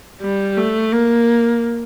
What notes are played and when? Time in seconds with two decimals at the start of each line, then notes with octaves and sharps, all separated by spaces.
0.22 G3
0.57 A3
0.93 A#3